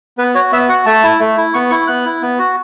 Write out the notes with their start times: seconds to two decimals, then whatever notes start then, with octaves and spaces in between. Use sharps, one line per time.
0.18 B3 B4
0.35 F#4 C#5
0.52 B3 E5
0.69 F#4 F#5
0.86 A3 A5
1.03 E4
1.19 A3
1.37 E4
1.54 B3 C#6
1.70 E4 C#6
1.87 B3 F#6
2.05 E4
2.22 B3
2.39 F#4